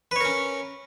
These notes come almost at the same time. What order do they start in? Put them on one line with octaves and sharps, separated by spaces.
B4 C#5 A#4 C#4